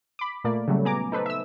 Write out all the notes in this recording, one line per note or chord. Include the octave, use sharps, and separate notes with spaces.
B5 D6
A#2 A3 A#3 D5
C#3 F#3 G3 A3
B3 G#5 A#5 D6
D#4 A4 B4 C5
E5 E6